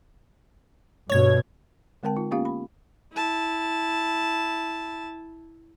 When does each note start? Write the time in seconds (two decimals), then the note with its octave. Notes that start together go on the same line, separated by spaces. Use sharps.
1.10 G2 B2 C#5 G#6
2.03 D3 G#3 C4 A#4 G5 A5
2.16 D#4 F4
2.31 A#3 B3 C#4 F4 G4 F5
2.45 B5
3.13 E4 A5